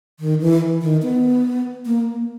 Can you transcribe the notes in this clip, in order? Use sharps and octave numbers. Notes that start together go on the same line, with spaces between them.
D#3
E3
D#3
B3
A#3